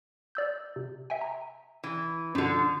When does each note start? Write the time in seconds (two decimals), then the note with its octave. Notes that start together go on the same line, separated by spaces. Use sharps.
0.35 D5 E6 G6
0.76 C3
1.10 E5 G5 G#5
1.21 A#5
1.84 E3
2.35 F#2 B2 D3 F3